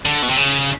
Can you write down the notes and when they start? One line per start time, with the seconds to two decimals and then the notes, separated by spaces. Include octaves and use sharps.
0.05 D3
0.22 B2
0.29 C3
0.36 C#3